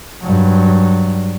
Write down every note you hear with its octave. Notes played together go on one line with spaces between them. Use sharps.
G2 F#3